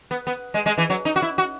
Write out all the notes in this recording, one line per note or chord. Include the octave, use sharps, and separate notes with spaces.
B3
B3
G#3
G#3
E3
F#3
D#4
F#4
E4
F#4